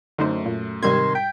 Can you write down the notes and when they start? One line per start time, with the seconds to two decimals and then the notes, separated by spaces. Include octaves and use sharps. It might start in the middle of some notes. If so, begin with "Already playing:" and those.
0.18 F#2 D3 A3 D#4 C5
0.46 A#2
0.83 G#2 C3 D#3 G3 D#4 C6 G#6
1.15 G5 G6 B6 D7